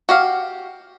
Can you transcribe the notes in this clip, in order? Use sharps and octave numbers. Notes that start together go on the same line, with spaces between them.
F#4 G4 F5